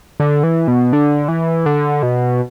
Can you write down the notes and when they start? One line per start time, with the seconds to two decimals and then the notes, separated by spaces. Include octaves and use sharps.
0.20 D3
0.43 E3
0.68 B2
0.93 D3
1.28 E3
1.66 D3
2.03 B2